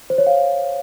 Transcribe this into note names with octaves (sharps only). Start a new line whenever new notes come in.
C5
C#5
F5